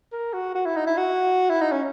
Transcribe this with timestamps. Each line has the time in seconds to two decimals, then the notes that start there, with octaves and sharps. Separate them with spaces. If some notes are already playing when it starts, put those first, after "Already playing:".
0.12 A#4
0.33 F#4
0.55 F#4
0.65 E4
0.76 D#4
0.87 E4
0.98 F#4
1.50 E4
1.61 D#4
1.72 C#4